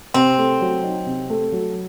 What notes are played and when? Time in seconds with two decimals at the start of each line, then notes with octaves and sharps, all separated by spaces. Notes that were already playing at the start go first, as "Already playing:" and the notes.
0.14 C3 C4
0.38 A3
0.61 F#3
0.83 D#4
1.06 C3
1.30 A3
1.52 F#3